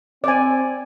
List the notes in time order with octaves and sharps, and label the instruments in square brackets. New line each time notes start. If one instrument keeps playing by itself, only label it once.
[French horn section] C4 [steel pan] D5 G#5